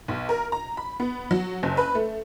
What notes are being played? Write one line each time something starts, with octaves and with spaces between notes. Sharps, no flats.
B1
A#4
A#5
B5
B3
F#3
F#1
B4
A3